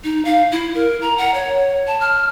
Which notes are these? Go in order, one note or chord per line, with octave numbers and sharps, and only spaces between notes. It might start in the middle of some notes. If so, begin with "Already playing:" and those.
D#4
F5
E4
A#4
A#5
F#5
C#5
A5
F6